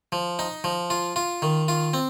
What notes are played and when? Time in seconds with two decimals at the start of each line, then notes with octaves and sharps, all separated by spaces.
0.12 F3
0.39 D#4
0.64 F3
0.90 F4
1.16 F4
1.42 D#3
1.68 F4
1.94 C4